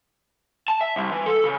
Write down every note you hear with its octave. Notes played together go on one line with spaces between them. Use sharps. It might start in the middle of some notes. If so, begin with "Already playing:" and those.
A5
E5
C2
E3
A4
C#3